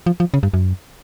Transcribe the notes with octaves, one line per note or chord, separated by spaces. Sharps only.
F3
F3
C#3
G2
F#2